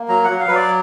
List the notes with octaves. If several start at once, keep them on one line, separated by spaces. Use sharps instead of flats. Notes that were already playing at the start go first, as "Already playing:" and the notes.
Already playing: A#3
F#3 A#5
F#5
F#3
F5
F#3 B4
D5